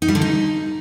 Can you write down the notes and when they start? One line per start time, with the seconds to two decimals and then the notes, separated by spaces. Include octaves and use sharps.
0.02 D#4
0.08 G3
0.15 D3
0.22 D#4